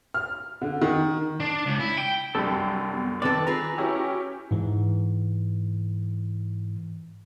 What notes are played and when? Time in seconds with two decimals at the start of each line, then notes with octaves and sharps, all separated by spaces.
0.14 F6
0.62 D3
0.82 D#3
1.40 D4
1.66 C#2
1.79 E4
1.98 G5
2.35 C2 F#2 G3 D4 G4 A4
2.92 B3
3.22 D#3 C4 D4 A4 B4 D5
3.47 C4 F4 G#4 B4 A#5
3.78 C#4 E4 F#4 G4
4.51 G#2 E3